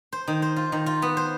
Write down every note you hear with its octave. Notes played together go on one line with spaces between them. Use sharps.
C5
D#3
C5
F4
D#3
F4
B3
C5